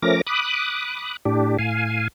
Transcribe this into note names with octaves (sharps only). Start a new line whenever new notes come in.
F3 A3 C#4 A#4 D6 A#6
B5 D6 D#6 F#6
A2 D4 G4
A2 F5 G#5